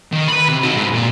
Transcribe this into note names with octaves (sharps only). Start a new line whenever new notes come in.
D#3
B4 B5
C3
D#4 F#4
G#2
A#2